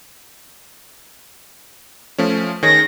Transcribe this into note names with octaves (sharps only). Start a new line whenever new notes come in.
F3 A3 C#4
D#3 G#4 C#5 A#6